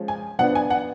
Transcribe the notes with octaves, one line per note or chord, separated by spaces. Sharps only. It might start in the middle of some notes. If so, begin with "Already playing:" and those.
Already playing: F3 G#3 C#4
G#5
F3 B3 D4 F#5
G#5
F#5